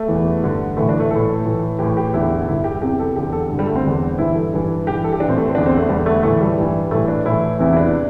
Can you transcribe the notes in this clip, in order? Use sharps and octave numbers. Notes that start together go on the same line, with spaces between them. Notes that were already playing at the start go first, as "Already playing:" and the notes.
Already playing: A3
E2 E3
G2 D3
A2 E3 A3
D4
A3
A2 E3 A4
A2 E3
A2 E3 G4
G4
E2 D3 E4
G2 D3 E4
G4
E2 C3 E3 G4
A4
E2 D3 G4
A4
G2 D3
G3
A3
C4
E2 D3
G2 E3 E4
A4
G2 E3
G2 E3 G4
A4
G4
E3 D4
A2 C4
A3
C4
E2 D3 D4
C4
A3
E2 D3 G3
A3
A2 E3 A3
G3
G2 E3
A2 E3 A3
D4
A2 E3 E4
E2 C3 E3 E4
E4
D4